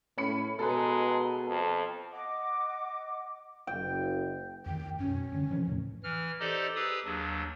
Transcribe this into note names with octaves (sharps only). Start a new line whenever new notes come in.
A2 C#4 B5 C#7
B2 G#3 A4 B4 A#5
F2 A5
D#5 F#5 D6
F#1 G5
F2 D#3 G5
F#2 B2 C#4
G2 D3
C3 E3 F3
E2 A2 C#3
E3 F6
D#4 G4 A4 C5 D5 D#5
G4 G#4 B4 D#6 E6
D#2 F#3 D4